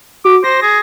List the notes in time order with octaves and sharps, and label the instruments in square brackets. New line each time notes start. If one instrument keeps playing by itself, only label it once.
[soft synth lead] F#4 [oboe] D6
[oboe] C5 [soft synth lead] A#6
[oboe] G#4